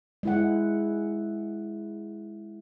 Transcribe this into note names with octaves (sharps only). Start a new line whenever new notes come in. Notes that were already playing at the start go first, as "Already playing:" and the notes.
G#3 E4 F#5